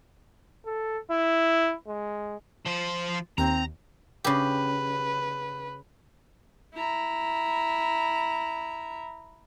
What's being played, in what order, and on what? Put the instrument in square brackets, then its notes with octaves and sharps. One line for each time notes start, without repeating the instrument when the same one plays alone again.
[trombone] A4
E4
G#3
[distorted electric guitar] F3 C5
[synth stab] D#2 [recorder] C4 [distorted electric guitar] A#5
[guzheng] C#3 G4 [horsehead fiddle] B4
[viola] E4 A#5